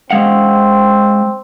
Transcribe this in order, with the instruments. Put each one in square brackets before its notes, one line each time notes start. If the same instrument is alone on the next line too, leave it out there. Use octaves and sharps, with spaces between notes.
[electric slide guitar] G#3 F5 F#5 [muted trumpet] C4